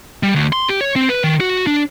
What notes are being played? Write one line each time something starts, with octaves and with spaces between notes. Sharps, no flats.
G3
D2
C6
G4
C#5
C4
B4
D#3
F#4
D4